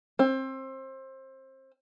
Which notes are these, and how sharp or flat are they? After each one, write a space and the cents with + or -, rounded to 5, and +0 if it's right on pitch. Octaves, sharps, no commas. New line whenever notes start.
C4 +25